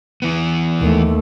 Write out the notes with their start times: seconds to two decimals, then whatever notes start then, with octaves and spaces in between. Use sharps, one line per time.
0.22 E3 B3
0.80 D#2 A3